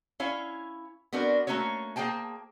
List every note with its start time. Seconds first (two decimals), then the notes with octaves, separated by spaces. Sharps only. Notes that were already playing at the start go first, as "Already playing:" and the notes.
0.20 C#4 E4 C#5 F5
1.13 B3 C4 D4 F#4 A#4
1.47 A3 A#3 C#4 F#4 C#5
1.96 A#3 G#4 C5 G5 A5